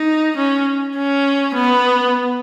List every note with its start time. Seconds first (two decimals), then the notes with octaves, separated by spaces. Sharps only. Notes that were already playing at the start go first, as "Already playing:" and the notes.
Already playing: D#4
0.37 C#4
0.97 C#4
1.54 B3